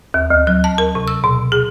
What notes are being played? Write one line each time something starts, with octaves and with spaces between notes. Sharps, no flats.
D#2
D2
F#3
A5
A#4
C3
E6
B2
G#4